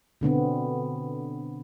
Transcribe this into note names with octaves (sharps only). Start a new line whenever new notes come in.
B2 D3 B3 C4